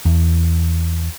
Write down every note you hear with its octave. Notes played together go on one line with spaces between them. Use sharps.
E2